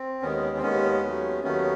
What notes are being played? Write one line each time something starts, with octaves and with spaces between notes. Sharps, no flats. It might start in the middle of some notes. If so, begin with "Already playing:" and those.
Already playing: C4
D#2 D#3 G#3 B3 C#4
C4
D#2 D#3 G#3 B3 C#4
D#2 D#3 F#3 A3
D#2 D#3 F#3 A3 B3 C#4